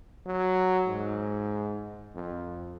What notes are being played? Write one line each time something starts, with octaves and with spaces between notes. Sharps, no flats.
F#3
G#2
F2